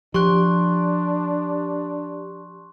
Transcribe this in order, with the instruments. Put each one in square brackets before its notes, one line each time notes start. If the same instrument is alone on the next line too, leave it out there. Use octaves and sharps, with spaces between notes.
[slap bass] F3 [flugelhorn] D4 [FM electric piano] G4 [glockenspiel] C6 C#6 F#6